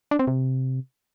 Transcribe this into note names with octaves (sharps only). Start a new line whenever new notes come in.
D4
C4
C3